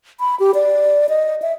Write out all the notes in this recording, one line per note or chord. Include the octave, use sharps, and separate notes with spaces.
B5
G4
D5
D#5
E5